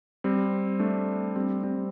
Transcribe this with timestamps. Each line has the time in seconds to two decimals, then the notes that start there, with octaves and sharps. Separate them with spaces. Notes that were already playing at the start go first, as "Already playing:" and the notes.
0.24 G3 C4
0.80 A3 D4
1.36 G3 C4
1.63 G3 C4